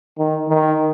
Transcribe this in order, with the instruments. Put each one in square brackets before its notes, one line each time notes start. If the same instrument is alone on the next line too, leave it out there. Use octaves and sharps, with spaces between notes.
[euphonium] D#3
D#3